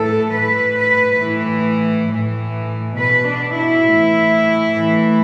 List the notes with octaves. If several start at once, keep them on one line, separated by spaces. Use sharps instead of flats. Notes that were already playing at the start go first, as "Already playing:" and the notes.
Already playing: A2 E3 A4
A2 E3 B4
B4
A2 E3
A2 E3
B2 B4
D4
E4
A2 E3
A2 E3